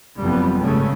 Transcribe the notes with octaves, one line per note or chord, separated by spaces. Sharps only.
F#1 F2 G3 B3
G#1 G2 C#3 A3 C#4